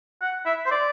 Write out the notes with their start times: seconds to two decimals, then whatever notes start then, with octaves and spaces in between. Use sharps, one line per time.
0.21 F#5
0.46 E5
0.66 C5
0.71 D5